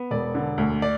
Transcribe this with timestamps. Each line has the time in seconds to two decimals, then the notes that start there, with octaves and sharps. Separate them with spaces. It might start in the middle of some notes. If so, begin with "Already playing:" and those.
Already playing: B3
0.11 E1 D5
0.35 D3
0.58 D2
0.82 D5